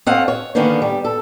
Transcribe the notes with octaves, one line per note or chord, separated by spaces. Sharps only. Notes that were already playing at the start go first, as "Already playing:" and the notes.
C4 C#4 A4 D#5 F5 F#5
C#5
D3 D#3 A#3 B3 C#4 D4
G3
A4